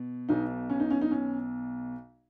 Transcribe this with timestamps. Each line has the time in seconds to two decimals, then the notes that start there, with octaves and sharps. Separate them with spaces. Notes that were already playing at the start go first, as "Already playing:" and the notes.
Already playing: B2
0.29 B1 B2 D#4
0.70 C#4
0.80 D#4
0.90 C#4
1.02 D#4
1.11 C#4